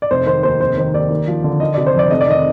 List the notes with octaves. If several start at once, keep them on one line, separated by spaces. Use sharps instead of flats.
D5
F1 C5
D#3 C5
D#2 C5
F1 C5
D#3 C5
D#2 D5
D#2
F3
D3
D#3 D#5
C3 D5
C5
F2 D5
F1 D#5
D5
D#3 D#5